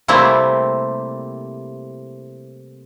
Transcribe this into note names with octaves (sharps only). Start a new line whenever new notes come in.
C3 G3 A3 A#3 C4 E4